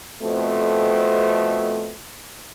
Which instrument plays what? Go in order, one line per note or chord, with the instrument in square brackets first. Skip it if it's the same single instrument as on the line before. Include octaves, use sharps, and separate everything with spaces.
[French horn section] F2 B2 A3 C4